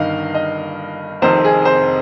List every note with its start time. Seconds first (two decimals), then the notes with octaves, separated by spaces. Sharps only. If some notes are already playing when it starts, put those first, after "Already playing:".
Already playing: G1 G2 D#3 D#5 F5
0.34 D#5
1.22 F1 F2 C3 D#3 C5
1.44 G#4
1.65 C5